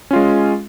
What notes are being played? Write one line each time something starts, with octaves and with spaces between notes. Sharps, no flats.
G#3 C#4 F4